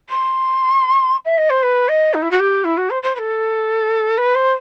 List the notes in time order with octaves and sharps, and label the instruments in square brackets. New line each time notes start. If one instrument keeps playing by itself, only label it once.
[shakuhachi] C6
E5
D#5
C5
B4
D#5
D#4
E4
F#4
G4
E4
F#4
C5
C5
B4
A4
B4
C5